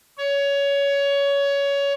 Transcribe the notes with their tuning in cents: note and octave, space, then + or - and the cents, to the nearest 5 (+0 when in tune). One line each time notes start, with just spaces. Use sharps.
C#5 +20